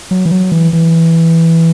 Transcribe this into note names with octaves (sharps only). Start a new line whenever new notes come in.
F#3
E3
F#3
E3
E3